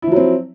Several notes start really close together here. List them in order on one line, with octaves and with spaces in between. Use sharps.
E4 F3 F#3 C4